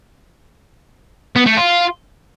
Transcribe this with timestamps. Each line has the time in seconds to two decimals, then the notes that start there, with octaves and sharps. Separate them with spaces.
1.36 B3
1.46 A3
1.57 F4